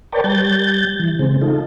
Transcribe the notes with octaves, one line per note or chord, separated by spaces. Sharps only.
A#4 B4 C#5 D5 G5 A5
G3 G6 A6
E3
C#3 G#3 C4
D#4 F4 A4